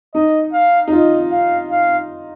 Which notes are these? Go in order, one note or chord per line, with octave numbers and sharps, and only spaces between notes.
D#4 D#5
F5
D#4
F4 D#5
F5
F5